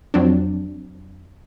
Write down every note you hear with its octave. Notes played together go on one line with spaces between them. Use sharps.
F2 F#3 C4 D4